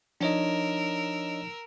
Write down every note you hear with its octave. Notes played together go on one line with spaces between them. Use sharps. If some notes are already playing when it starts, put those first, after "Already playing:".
F3 D4 D#4 A#4 C#5 D#5 E6